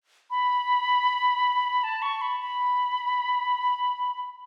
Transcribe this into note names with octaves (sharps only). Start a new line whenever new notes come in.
B5
A5
C#6
B5
B5